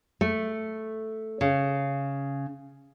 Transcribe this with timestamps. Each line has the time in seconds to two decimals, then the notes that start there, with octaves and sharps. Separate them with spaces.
0.21 A3
1.41 C#3